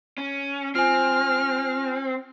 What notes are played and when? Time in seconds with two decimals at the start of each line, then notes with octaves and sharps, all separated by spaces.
0.18 C#4
0.75 C4 F4 G#5 F6